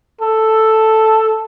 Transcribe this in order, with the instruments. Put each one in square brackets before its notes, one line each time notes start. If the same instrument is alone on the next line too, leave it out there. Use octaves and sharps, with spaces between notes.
[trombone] A4